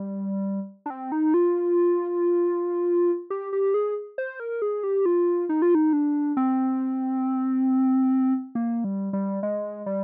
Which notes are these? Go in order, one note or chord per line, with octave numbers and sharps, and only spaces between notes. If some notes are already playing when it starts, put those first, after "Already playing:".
Already playing: G3
D4
C4
D#4
F4
G4
G4
G#4
C5
A#4
G#4
G4
F4
D#4
F4
D#4
D4
C4
A#3
G3
G3
G#3
G3